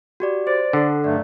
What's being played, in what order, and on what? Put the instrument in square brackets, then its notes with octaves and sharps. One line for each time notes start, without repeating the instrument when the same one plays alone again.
[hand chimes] F#4 G4 D5
[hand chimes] C5 [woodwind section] D5
[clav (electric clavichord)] D3 [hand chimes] A4 F#5
[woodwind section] G2 F#3 A3 [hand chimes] D5